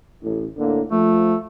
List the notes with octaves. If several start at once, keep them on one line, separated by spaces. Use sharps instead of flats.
A1
A2 D3 A#3
F3 A3